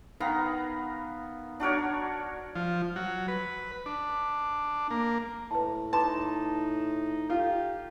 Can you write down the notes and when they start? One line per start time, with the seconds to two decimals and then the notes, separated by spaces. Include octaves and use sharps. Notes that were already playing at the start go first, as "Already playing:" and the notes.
0.20 D#3 B3 F5 A#5
1.60 D4 F#4 A#4 C#5
2.55 F3
2.96 F#3
3.28 B4
3.86 D4
4.90 A#3
5.51 A2 B4 A5
5.93 D#4 B4 A5 C6 D6
7.30 F4 G4 A4